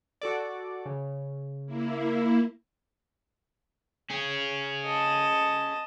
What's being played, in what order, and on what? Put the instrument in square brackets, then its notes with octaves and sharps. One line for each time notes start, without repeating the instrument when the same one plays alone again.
[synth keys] F#4 A4 D5
C#3
[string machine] A#3 E4
[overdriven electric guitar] C#4 G#4
[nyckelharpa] D#5 A5